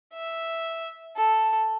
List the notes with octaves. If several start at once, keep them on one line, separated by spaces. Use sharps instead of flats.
E5
A4